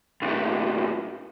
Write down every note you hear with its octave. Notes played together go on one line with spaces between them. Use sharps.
B1 A2